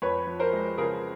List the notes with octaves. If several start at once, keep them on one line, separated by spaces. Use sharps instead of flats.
F2 B4 C#5
F3
A#4 C5
G#3
C#3 G#4 A#4